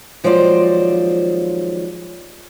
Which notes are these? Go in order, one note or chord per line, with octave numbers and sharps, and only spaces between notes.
D#2 F3 F#3 G#3 C5 D5